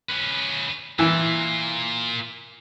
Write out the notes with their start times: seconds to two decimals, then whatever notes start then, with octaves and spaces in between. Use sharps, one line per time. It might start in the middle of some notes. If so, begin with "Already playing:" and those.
0.10 C#4 B4
0.99 E3 A#3 F4